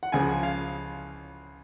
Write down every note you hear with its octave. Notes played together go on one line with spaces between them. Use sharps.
F#5
C#2 C#3 F3 G#3 G#5
F5